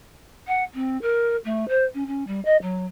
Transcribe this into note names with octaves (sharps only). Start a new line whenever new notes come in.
F#5
C4
A#4
A3
C5
C#4
C#4
G3
D#5
F#3